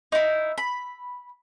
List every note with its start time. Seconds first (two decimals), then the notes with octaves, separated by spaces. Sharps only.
0.12 D#4 E4
0.58 B5